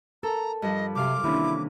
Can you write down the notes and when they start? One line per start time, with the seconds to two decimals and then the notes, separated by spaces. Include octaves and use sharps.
0.23 A4 A#4 A#5
0.62 G2 F3 D#5
0.95 F#2 C3 F5 C6 D6
1.24 C3 D#3 E3 A#3 C#4 D4 E4